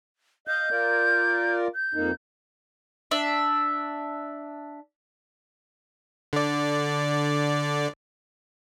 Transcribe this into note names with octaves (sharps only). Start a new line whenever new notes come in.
D#5 F5 G6
F4 A#4 D5
G6
F2 A#3 D#4
D4 E5
D3 D5